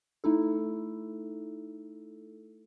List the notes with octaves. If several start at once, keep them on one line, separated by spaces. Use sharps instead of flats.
A3 D#4 E4 A4